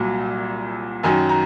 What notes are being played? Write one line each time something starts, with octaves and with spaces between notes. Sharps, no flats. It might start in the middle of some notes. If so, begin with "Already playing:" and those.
Already playing: C2 A#2 F#3
F#2 D#3 F#3 G#5
A#5